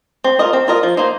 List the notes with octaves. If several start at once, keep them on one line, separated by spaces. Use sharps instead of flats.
C4
F4 A#4 D#5
C4
F4 A#4 D#5
F3
A#3 D#4 C5